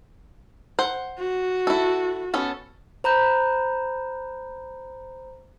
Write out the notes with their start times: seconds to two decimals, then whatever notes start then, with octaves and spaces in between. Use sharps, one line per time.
0.79 C5 F#5
1.19 F#4
1.67 E4 A4
2.34 B3 C#4 A4
3.04 C5 A#5 B5 G6